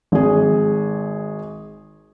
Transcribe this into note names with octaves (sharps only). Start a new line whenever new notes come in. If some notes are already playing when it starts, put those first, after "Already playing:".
G#1 G#4